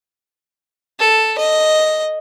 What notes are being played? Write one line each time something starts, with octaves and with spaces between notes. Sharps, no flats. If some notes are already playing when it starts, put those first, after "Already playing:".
A4
D#5